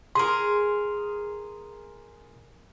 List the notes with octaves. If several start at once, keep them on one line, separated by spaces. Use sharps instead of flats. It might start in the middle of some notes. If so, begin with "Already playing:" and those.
G#4 A#4 C6